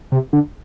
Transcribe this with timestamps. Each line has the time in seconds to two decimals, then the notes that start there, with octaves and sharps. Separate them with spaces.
0.12 C3
0.33 D3